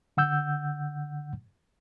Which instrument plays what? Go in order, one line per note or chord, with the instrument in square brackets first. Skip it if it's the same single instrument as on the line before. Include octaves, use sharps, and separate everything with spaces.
[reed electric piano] D3 F#5 E6 G6